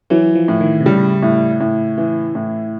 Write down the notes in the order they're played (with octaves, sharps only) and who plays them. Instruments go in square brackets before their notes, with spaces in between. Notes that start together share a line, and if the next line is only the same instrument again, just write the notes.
[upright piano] E3 [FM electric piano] F#3
[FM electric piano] F3
[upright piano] A2
[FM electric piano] D#3
C3
[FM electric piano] C#3 [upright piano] G3
[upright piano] A2
A2
E3
A2